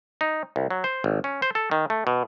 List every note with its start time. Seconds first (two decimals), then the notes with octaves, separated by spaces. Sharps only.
0.21 D#4
0.56 C2
0.71 F#3
0.84 C5
1.04 G#1
1.24 C#4
1.42 C5
1.55 A4
1.71 D#3
1.90 A3
2.07 B2